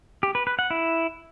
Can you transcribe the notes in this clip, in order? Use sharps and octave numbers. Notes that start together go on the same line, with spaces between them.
G4
B4
B4
F#5
E4